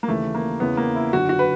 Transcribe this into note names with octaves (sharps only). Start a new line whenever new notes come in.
A#3
D#2 C#3 E3 A3
A#3
E2 C#3 E3 B3
A#3
E4
F#2 D3 F#4
F#4
B4